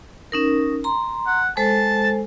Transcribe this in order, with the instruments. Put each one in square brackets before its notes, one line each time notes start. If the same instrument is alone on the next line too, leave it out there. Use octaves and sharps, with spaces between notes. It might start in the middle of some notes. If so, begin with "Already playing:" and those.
[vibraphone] C#4 D#4 A#4
A#5 C6
[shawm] F#5
[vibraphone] G#3 A4 C5 [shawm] A5